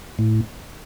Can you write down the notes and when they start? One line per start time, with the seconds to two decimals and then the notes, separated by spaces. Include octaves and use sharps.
0.19 A2